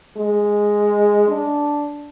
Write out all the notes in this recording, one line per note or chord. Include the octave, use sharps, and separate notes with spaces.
G#3
D4